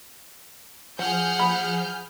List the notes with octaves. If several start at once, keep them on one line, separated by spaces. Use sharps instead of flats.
F3 G#4 F#5 F6 G6
B5